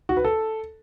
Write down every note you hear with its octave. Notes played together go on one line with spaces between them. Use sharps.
F#4
B4
A4